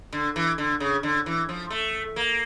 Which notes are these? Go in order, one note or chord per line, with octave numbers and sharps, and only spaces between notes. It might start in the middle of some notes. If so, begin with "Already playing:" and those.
D3
E3
D3
C#3
D3
E3
F3
A3
A#3